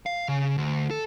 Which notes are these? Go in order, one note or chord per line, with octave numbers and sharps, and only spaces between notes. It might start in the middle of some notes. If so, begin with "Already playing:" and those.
F5
C#3
D2
A4